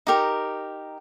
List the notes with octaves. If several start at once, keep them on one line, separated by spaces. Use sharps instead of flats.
D#4 G4 A#4